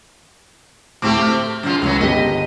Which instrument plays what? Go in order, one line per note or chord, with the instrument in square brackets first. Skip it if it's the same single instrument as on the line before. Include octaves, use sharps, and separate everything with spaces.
[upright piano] D2 A2 D6 [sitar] A3 C4 G4
[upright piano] F6
[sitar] F#2 C#3 F4
[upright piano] C#2 [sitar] E3 F#3 C#4
[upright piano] G1 G4 B6 [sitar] D#5